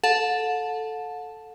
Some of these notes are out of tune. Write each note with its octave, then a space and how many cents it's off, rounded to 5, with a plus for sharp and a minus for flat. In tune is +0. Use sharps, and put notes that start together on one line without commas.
A4 +0 F#5 -40 A5 +0